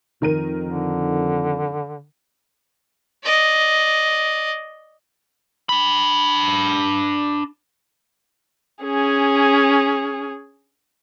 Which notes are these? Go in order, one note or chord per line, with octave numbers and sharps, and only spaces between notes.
F2 D#3 A#4 D#7
D3
D5 D#5
D4 B5
C#4 G#4